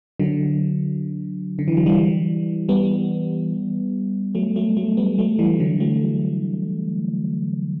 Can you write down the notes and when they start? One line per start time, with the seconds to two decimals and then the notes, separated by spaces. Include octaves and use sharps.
0.20 D3 F#3
1.59 D3
1.68 E3
1.77 F#3
1.86 E3 G3
2.69 G3 B3
4.35 F#3 A3
4.56 F#3 A3
4.77 F#3 A3
4.97 G3 B3
5.18 F#3 A3
5.39 E3 G3
5.60 D3 F#3
5.80 F#3 A3